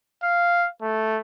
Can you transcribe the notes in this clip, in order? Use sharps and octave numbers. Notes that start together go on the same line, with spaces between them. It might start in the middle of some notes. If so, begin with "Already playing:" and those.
F5
A3